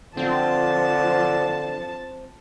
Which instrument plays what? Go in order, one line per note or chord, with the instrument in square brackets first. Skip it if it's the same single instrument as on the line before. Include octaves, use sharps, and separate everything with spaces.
[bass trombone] D3 [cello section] F3 [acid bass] C4 [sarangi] A5